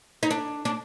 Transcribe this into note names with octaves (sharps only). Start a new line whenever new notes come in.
D#4
D4
D4